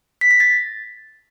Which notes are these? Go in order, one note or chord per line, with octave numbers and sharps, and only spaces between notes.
B6
A#6
A6